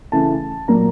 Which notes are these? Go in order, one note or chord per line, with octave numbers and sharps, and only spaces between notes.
C#3 E3 A3 A5
A#2 F#3 A#3 A#5